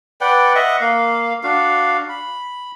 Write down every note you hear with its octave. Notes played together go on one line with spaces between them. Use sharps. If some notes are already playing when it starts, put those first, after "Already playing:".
B4 D5 F#5 G5
D#5 E5 F#5 C#6
A#3 F5
D4 F#4 F5
B5